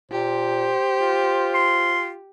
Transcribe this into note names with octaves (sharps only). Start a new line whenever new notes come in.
A#2 G4 C5
F4
C6